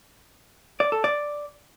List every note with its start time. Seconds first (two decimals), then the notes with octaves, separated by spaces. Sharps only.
0.80 D5
0.92 A4
1.04 D5